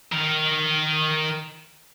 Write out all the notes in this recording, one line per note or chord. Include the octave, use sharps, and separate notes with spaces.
D#3 A#4